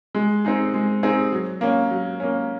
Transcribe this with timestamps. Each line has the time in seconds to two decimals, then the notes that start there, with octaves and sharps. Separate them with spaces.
0.15 G#3
0.45 C4 D#4 G#4
0.74 G#3
1.03 C4 D#4 G#4
1.32 F#3
1.61 A#3 C#4
1.91 F#3
2.20 A#3 C#4